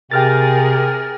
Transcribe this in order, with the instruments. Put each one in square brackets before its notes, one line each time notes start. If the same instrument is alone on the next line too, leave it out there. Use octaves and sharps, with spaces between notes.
[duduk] C3 [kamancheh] G#4 A#4 [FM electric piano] G5 F6 A6